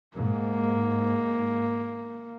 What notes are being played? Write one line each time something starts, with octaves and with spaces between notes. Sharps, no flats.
G#2 A#3